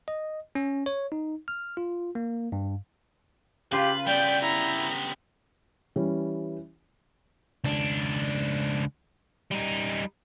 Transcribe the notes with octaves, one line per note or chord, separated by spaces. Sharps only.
D#5
C#4
C#5
D#4
F6
F4
A#3
G2
C#3 F4 G4 B4
G3 B3 D5 G5 G6
E4 A#5
E3 G3 C#4
C#2 D4
G3 D#4